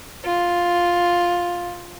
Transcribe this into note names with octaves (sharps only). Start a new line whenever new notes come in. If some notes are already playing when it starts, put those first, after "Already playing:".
F4